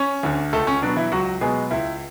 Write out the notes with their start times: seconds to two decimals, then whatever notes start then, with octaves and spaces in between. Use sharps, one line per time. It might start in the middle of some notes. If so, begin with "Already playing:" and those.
Already playing: C#4 C#5
0.23 D2 D3
0.53 C#2 A3 A4
0.67 C#4
0.82 B2 F#3 B3 D4
0.97 E3 E4
1.12 C#2 F#3 F#4
1.41 B2 F#3 G#3 B3 G#4
1.71 C#2 E4 E5